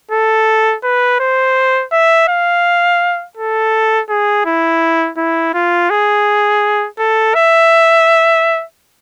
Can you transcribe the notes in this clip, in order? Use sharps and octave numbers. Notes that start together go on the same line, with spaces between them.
A4
B4
C5
E5
F5
A4
G#4
E4
E4
F4
G#4
A4
E5